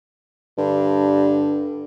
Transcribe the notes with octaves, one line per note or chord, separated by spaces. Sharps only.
G2 D3